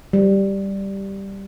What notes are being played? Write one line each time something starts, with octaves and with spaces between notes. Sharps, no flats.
G3